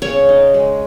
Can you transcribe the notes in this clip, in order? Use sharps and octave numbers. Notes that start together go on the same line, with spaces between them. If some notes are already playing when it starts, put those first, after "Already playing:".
C#3 C#5
D#4
G#3